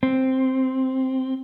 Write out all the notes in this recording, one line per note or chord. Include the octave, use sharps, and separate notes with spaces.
C4